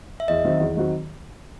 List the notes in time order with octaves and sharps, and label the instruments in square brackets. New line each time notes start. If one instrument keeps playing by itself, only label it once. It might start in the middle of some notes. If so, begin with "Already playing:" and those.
[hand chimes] E5
[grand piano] E2 [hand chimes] D#5
[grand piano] D#3 F#3 C4 F#4
E2
D#3 F#3 C4 F#4